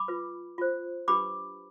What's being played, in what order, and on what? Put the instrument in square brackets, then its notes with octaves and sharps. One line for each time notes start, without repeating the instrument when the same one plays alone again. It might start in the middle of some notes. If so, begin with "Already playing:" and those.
Already playing: [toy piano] B5 D6
F4 B4
F4 C5
D4 G4 B4 B5 D6